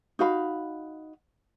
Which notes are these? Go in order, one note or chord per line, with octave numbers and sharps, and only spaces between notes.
D#4 F#4 F5 B5